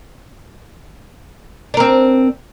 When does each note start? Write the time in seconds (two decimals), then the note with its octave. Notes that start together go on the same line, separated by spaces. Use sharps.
1.74 D4
1.77 A#4
1.80 C4